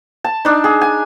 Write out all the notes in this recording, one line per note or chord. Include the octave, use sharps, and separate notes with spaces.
A5
D4 D#4
G#4
G#5